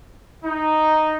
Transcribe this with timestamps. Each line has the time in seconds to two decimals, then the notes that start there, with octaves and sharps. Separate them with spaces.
0.44 D#4